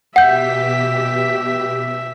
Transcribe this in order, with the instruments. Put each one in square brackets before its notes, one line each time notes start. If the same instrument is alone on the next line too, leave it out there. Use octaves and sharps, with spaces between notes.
[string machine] B2 G4 B6 [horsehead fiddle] E5 [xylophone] F#5 G6